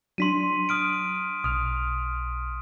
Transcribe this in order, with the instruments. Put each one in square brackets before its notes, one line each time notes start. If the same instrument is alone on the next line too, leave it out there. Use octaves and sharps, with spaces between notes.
[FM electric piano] F#3 D4 [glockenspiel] C6 B6 D#7
[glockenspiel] D#6 F6 D7
[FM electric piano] B1 F6 [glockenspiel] D#6